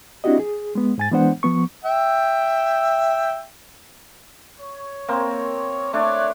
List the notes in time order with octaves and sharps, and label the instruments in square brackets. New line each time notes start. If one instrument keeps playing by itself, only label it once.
[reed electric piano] C4 D4 E4 F#4 G4 D#5
G#4
G#3 B3
G#2 G#5 A6
E3 G#3 B3 D4 C5 F#5
F3 B3 C#6
[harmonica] E5 G5
[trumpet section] C#5
[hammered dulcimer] A#3 C4
[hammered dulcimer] A3 D4 [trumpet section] C#5 D5